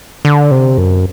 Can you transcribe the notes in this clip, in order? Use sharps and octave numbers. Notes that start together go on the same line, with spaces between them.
D3
C3
F#2